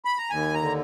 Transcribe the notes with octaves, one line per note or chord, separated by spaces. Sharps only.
B5
A#5
D#2 G#5
A#5
D3